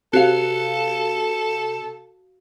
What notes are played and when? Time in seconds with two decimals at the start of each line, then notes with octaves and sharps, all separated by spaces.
0.13 C3 F#4 A4 F5